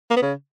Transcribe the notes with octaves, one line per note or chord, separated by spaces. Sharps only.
A#3
B3
C#3